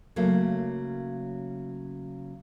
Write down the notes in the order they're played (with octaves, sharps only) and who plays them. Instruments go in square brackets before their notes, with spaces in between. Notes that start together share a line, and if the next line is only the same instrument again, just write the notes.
[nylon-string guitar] C#3 F#3 A3 A#3